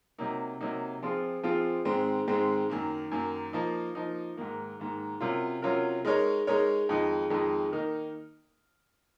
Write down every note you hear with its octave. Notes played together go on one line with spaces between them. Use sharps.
C3 F#3 A#3 D#4
C3 F#3 A#3 D#4
F3 C4 F4 G#4
F3 C4 F4 G#4
G#2 D#3 G#3 C4
G#2 D#3 G#3 C4
F#2 D#3 A#3
F#2 D#3 A#3
F3 A#3 D#4
F3 A#3 D#4
G#2 D#3 A#3
G#2 D#3 A#3
C3 F#3 C#4 F4 A#4
C3 F#3 C#4 F4 A#4
G#3 D#4 A#4 C#5
G#3 D#4 A#4 C#5
F2 D#3 G#3 D#4
F2 D#3 G#3 D#4
D#3 A#3 D#4 A#4